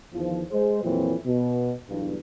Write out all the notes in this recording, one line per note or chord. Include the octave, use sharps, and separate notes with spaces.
E2 D#3 F3
G#3 C5
F2 A#2 E3 F#3 C4
B2
B1 E2 G2